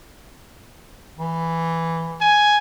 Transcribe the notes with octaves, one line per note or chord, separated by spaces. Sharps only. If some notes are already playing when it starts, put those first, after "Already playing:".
E3
G#5